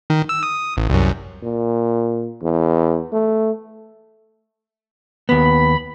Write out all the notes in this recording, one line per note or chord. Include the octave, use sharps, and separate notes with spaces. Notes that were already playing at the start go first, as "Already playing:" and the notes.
D#3
E6
D#6
A1
C2 F#2
A#2
E2
A3
D#2 B3 B5